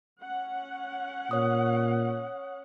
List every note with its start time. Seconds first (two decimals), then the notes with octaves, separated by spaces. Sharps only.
0.22 C#4 F#5
1.31 A#2 C#5 D#6